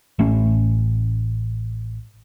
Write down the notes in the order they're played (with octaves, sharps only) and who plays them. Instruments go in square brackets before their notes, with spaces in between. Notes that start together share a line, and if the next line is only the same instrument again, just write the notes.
[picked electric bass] A1 A3 C#4